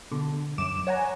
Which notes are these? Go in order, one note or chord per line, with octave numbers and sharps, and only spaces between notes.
B2 D3
F#2 D6 E7
C#5 F#5 G#5 A#5